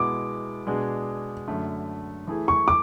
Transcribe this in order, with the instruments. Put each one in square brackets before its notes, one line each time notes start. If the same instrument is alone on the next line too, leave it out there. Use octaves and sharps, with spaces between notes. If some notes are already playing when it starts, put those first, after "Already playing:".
Already playing: [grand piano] B2 G#3 B3 E4 [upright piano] D6
[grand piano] B2 G#3 D4 G#4
F#2 D3 A3
E3 A3 E4 G#4
[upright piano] C#6
D6